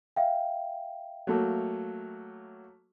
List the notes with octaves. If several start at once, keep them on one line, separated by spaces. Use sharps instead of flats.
E5 F5 G5
F#3 A3 A#3